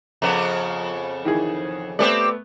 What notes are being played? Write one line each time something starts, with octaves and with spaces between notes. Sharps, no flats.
F2 C#3 B3 A#5
D#3 E3 G#4
A3 B3 C4 G4 D5